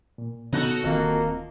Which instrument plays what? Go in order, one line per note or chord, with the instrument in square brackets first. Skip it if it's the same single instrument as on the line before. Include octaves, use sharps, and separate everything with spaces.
[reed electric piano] A#2
[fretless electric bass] C#3 B3 [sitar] D#4 F#4 A4
[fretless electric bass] D1 D#3 [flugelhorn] A#3 [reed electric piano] C4 F4 D#5